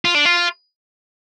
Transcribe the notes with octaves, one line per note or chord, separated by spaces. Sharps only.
F4
D4
F4